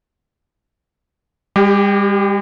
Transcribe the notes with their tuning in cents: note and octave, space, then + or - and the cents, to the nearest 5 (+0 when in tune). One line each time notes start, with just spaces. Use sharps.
G3 +45 G4 +0